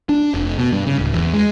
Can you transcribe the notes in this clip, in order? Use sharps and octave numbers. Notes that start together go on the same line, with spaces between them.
D4
F1
B2
G2
C#3
D1
E2
G#3